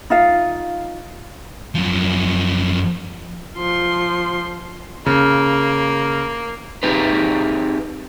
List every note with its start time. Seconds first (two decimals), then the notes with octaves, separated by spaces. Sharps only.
0.10 D#4 F4 F5
1.75 F#2 F3
3.57 F3 C6
5.06 C#3 A#3
6.83 C4 D#4 G4 G#4 B4